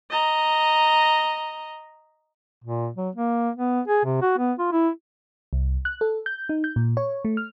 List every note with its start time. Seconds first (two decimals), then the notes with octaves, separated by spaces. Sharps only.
0.10 D#5 A#5
2.64 A#2
2.97 F#3
3.15 A#3
3.56 B3
3.88 G#4
4.05 C3
4.22 F#4
4.38 B3
4.59 F4
4.72 E4
5.53 C2
5.85 F#6
6.01 A4
6.26 G6
6.49 D#4
6.64 G6
6.76 A#2
6.97 C#5
7.25 A3
7.37 F6